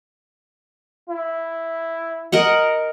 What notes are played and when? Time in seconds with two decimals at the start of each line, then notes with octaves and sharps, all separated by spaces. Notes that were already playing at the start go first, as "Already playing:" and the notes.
1.09 E4
2.32 A#4 D#5 F#5